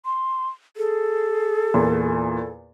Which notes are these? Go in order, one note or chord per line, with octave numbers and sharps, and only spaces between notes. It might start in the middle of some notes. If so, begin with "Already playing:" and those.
C6
G#4 A4
E2 A#2